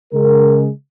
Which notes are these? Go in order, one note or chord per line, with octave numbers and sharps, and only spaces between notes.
C#3 G#3 A#4